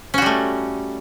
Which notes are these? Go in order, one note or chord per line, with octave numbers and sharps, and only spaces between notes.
G3 A3 C#4 F#4